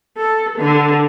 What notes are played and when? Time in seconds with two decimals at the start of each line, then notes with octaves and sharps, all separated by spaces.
0.17 A4
0.58 D3